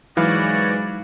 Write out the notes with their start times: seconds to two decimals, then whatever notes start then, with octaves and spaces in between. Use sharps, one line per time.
0.17 G#2 E3 F#3 F#4 C#5 D5 F5 B5